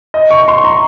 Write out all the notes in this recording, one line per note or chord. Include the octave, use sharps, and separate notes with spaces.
D#5
C#6
C6
A#5